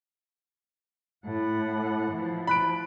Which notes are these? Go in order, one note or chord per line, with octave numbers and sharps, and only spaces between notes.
A2 F#5
E3 F3
B5 F#6 D7